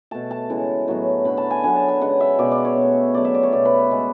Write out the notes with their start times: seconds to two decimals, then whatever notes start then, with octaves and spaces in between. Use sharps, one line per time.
0.11 B2 A3 A5
0.31 A5
0.50 C#3 E3 G#3
0.88 A2 F#3 B3
1.25 D3 A3 B5
1.37 A5
1.51 G#5
1.64 D3 F#3 B3 G#5
1.76 A5
1.88 G#5
2.01 C#3 G#3 B3 F#5
2.20 E5
2.39 B2 G#3 B3 D5
2.52 D5
2.65 C#5
2.77 B2 A3
3.14 C#3 F#3 A3 D5
3.25 E5
3.35 D5
3.43 C#5
3.53 B2 A3 D5
3.65 B4
3.91 C#3 G#3 B3